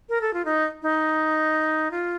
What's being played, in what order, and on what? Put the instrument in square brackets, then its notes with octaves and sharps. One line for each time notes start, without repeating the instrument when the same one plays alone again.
[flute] A#4
A4
F4
D#4
D#4
F4